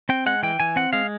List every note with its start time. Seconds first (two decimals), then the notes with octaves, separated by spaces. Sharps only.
0.09 C4 G5
0.26 G#3 F#5
0.43 E3 G5
0.60 E3 G#5
0.76 C4 F#5
0.93 G#3 F5